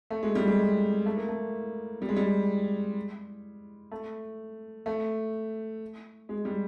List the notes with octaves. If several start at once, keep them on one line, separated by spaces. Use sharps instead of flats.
A3
G#3
G3
G#3
A3
A#3
A3
G3
G#3
G3
A3
A3
G#3
G3